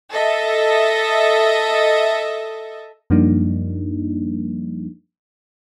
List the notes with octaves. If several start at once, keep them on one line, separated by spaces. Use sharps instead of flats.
A4 D#5 E5
F#2 F3 G3 A#3 D4 D#4